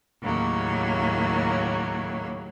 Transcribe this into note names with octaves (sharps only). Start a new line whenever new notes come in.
D#2 A2 C#3 F#3 A#3